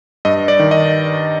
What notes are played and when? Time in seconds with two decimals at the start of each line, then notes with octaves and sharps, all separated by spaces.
0.25 G2 D#5
0.48 D5
0.59 D#3
0.71 D#5